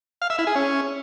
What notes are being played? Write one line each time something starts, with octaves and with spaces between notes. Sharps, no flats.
F5
E5
E4
G#4
C#4